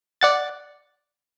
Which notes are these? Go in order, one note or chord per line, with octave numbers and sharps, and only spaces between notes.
D5 F#5 A6